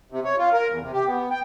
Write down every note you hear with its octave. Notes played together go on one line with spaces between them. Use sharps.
C3
C#5
F4
A#4
E2
C3
G4
B3
G5